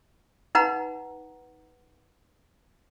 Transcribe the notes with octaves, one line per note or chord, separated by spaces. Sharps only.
D#4 B4 F#5 A#5